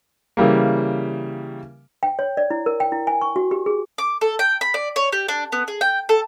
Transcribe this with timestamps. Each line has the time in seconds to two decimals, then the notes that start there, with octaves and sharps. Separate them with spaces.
0.37 C#3 E3 G3 A#3
2.03 G5
2.19 C#5
2.37 D5
2.50 E4
2.66 A#4
2.80 G5
2.92 E4
3.07 G#5
3.21 C#6
3.36 F#4
3.51 G4
3.66 G#4
3.98 D6
4.21 A4
4.39 G5
4.61 B5
4.74 D5
4.96 C#5
5.13 G4
5.28 D4
5.52 B3
5.68 G#4
5.81 G5
6.09 A4